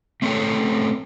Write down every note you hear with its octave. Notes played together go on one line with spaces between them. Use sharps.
A3 C4 C#4 A4 C#5 G5